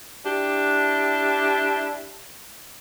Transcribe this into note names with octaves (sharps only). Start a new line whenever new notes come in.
D4 E4 G4